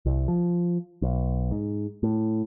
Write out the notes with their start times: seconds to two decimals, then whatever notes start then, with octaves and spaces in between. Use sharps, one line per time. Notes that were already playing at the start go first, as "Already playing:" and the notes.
0.06 C2
0.28 F3
1.02 B1
1.51 G#2
2.03 A2